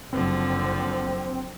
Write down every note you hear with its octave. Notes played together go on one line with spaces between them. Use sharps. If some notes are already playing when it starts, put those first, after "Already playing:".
F#1 D3 F3 C4